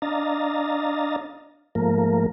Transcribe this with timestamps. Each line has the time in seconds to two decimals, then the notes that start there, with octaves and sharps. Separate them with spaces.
0.02 D4 D#5 F5 A#5 A6
1.75 G#2 F3 A3 A#3 A#4